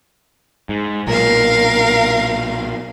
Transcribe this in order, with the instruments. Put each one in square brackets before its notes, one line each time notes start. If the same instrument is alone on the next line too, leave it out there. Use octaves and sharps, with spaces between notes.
[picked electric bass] G#2
[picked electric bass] B1 A#2 [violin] A#4 F5